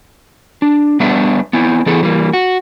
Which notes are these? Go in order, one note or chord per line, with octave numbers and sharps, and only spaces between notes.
D4
G3 B3 D4 B4 E5
B3 C4 E4
E3 B3 E4 G#4 A4
E3 G3 A#3
F#4